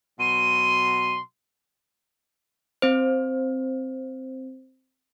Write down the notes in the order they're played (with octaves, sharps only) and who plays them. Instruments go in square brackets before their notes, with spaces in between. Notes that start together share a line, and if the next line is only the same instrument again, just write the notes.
[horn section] B2 F#3 C6 [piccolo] D#7
[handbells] C4 C5